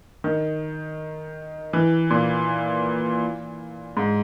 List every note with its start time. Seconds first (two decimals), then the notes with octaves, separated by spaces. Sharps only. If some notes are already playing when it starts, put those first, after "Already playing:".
0.24 D#3
1.73 E3
2.10 A#2
3.97 G#2